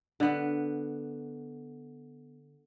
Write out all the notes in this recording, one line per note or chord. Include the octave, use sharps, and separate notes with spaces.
D3 B3